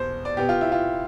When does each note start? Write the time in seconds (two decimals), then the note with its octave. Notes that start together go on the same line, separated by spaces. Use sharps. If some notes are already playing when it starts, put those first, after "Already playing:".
Already playing: E2 B2 B3 C5
0.25 D5
0.37 B2 B3 G4
0.49 F4
0.61 E4
0.72 F4